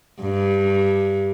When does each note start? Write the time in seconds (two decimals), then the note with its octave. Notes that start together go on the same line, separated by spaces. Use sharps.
0.21 G2